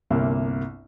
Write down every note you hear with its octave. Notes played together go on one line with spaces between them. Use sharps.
G1 C2 A#3